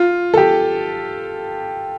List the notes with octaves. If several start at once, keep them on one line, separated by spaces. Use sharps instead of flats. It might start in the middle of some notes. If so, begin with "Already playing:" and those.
Already playing: F4
A4
G4